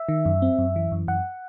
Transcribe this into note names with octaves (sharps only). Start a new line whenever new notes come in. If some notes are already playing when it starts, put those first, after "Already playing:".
Already playing: E5
D#3
F#2
C4
F#2
E3
F#2
F#2 F#5